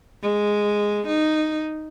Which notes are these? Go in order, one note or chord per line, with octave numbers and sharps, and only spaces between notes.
G#3
D#4